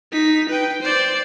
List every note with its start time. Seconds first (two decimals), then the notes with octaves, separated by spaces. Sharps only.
0.12 D#4 B6
0.49 B4 G5
0.80 C5 D5